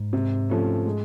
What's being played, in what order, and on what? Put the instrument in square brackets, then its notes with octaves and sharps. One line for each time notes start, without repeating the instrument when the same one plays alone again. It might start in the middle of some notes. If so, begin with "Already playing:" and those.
Already playing: [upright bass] G#2
[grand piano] C3
F3 A3 C#4
G#3